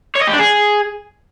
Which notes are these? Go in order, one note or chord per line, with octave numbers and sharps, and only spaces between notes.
C#5
D#5
G4
D4
G#4